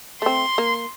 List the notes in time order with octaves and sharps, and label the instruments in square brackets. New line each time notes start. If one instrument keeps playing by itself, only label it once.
[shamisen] A3 C4 [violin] C6
[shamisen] A#3